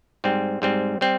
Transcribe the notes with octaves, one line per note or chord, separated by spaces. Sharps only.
G#2 G3 C4
G#2 G3 C4
G3 C4